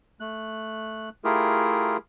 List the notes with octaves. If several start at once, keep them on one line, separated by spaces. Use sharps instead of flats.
A3 F#6
A3 E4 F4 G4 G#4 A#4